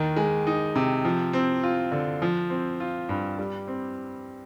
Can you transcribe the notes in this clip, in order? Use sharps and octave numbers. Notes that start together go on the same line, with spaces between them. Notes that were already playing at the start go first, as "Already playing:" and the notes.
Already playing: D#2 D#3
G#3
D#4
C3
F3
C4
F4
D3
F3
C4
F4
G2
G3
C4